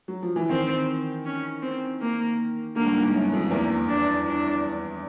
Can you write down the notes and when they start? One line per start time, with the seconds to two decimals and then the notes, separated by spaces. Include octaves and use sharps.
0.08 F#3
0.22 F3
0.36 E3
0.49 D#3 C4
1.25 C#4
1.63 C4
2.01 A#3
2.76 D3 A#3
2.85 G2
2.94 G#2
3.04 G2
3.14 F#2
3.33 F2
3.51 E2 A#3
3.89 D4
4.27 D4